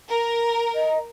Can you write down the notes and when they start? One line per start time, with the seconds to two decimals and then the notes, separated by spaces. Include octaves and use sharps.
0.10 A#4
0.75 D#5